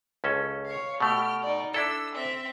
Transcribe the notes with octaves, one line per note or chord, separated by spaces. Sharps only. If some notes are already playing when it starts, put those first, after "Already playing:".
C#2 C#4 A4
C#5 F5
B2 A3 G4 F6
D#4 D5
D4 E4 A4 E6
C4 E5